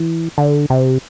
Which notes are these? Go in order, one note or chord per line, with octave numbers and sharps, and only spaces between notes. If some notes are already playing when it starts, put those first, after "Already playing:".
Already playing: E3
D3
C3